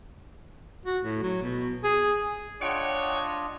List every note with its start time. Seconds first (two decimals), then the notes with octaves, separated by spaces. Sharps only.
0.85 F#4
1.03 A2
1.22 F#3
1.43 B2
1.84 G#4
2.61 D4 F4 C#5 D#5 F#5 G5 F#6